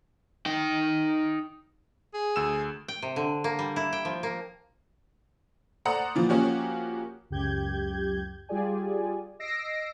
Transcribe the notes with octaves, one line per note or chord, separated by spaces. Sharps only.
D#4 G5
G#4
D2 E6 E7
G5
C3
D3
A#3
G3
E4
G5
F3
A#3
A4 C5 D5 F#5 A#5 D#6
A#2 E3 F3
F3 A#3 C#4 F#4 G4
C#2 F#2 G4 G6 G#6
G3 F4 G4 G#4 D5 G#5
D#5 E6 A#6 C7 D7